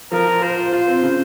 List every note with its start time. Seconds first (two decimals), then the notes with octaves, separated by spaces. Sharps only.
0.11 F3 A#4
0.27 F4
0.42 F4 C5
0.57 F4
0.72 F4
0.88 C4
1.03 C#3